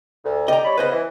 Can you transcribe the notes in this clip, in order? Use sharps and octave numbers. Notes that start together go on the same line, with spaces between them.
D2
D3 G4 D5 D#5 A#5
G3 C#5 B5
C#3 B3 B4 C5 D#5
E3